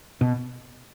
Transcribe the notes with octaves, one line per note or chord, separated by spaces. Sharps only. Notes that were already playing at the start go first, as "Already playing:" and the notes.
B2